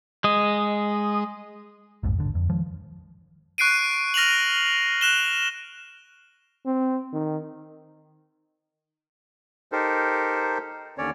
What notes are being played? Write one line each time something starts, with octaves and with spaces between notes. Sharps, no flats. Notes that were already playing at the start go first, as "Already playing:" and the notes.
G#3 D#5
A#1 F2 G#2
D#1 G#1 D3
F2
D#3 F3 G#3
C#6 F#6 C7 D7 D#7
F6 A#6 D#7 F7 F#7
F#6 E7 G7
C4
D#3
D#4 G4 A4 A#4 C5
D#2 D3 C#4 C#5 D5